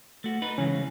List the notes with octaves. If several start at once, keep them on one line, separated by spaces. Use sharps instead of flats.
A3 F#4
D#4 B4
C#3 E3 G#3 C#4